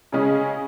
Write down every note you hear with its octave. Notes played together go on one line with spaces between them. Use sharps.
C#3 G#3 C#4 G#4